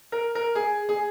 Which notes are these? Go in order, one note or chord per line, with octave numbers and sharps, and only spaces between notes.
A#4
A#4
G#4
G#4